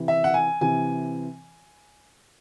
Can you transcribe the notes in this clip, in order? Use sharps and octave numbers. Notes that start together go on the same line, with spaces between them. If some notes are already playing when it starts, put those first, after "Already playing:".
Already playing: C3 E3
E5
F#5
G#5
C3 E3 G#5